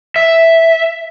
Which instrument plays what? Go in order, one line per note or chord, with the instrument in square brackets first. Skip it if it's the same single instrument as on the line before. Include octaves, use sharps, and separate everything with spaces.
[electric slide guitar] E5